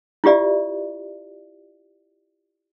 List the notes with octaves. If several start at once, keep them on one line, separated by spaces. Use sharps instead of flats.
E4 F4 G4 D5 E5